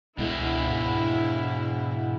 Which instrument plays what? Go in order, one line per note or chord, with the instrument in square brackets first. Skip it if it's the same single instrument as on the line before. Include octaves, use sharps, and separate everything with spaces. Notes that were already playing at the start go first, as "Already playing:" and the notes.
[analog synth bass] C#2 [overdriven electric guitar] B2 G#3 [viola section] E4
[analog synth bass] G#2